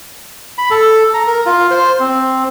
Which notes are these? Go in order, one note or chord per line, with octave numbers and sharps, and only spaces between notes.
B5
A4
A#5
A#4
F4
C5
C4